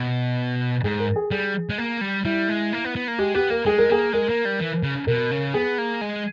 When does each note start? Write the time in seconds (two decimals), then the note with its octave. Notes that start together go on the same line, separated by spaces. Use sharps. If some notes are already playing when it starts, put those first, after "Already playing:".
Already playing: B2
0.84 G#2 G#4
1.00 A#4
1.16 G#4
1.31 G3 G#4
1.70 G#3
1.78 A#3
2.01 G3
2.25 G3 E4
2.49 G#3
2.73 A#3
2.85 B3
2.96 B3
3.08 A#3
3.19 G#3 G4
3.34 B3 G4
3.50 A#3 A#4
3.66 G#3 G#4
3.78 A#4
3.90 A#3 G#4
4.13 G#3 A#4
4.29 A#3
4.45 G3
4.60 E3
4.83 C#3
5.07 B2 A#4
5.31 C#3
5.54 B3 G#4
5.78 A#3
6.01 G#3